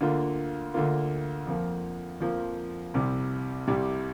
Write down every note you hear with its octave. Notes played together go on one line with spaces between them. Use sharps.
D2 D3 A#3 F4
D2 D3 A#3 F4
F2 F3 A#3
F2 F3 A#3
C2 C3 G3
C2 C3 G3